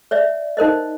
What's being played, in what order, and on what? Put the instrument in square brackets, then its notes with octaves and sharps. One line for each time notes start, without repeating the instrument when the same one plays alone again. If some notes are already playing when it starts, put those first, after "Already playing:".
[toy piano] C#5 D5 E5
D#4 A#4 C5 D#5